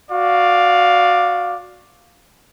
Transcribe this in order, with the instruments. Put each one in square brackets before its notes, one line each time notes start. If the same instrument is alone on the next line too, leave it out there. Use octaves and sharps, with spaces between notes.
[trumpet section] F#4 D5 F5